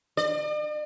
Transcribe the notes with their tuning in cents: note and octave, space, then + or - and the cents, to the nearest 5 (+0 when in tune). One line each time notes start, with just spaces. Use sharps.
D5 +45